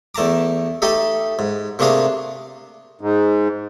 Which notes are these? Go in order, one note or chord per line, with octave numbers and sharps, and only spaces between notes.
E2 A3 A5 A#5 D6
A3 D#4 G4 A4 D#5
G#2
C3 A3 A#3 D4 G#4 A#5
G#2